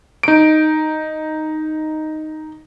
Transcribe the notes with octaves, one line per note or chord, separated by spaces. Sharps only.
D#4 D7